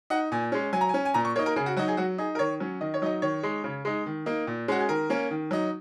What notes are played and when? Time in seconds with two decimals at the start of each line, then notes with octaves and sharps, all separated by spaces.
0.10 D#4 F#5
0.32 A#2 G#5
0.52 G#3 C#4
0.73 F#3 G#5
0.81 A#5
0.89 G#5
0.94 C#4
1.05 G#5
1.14 A#2 A#5
1.25 C#6
1.36 A#3 D#4 C#5
1.46 A#4
1.56 C#3 G#4
1.66 F#4
1.77 F#3 D#4 F#4
1.88 G#4
1.97 F#3 F#4
2.18 D#4 G#4
2.35 A#4
2.39 D#3 C#5
2.60 F#3 C#4
2.81 D#3 D#5
2.94 C#5
3.02 F#3 D#4 D#5
3.22 D#3 C#5
3.43 G#3 D#4
3.64 C#3
3.85 G#3 D#4
4.06 D#3
4.26 A#3 D#4
4.47 A#2
4.68 G#3 C#4 F#4
4.80 G#4
4.89 D#3 A#4
5.10 A#3 C#4
5.31 D#3
5.51 F#3 D#4